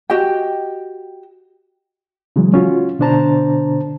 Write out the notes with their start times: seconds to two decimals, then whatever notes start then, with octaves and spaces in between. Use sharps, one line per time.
0.10 F#4 G4 D#5 G5
2.36 C#3 E3 F#3 G#3
2.54 C#4 F4 F#4
2.99 B2 D3 D4 C5 A5 A#5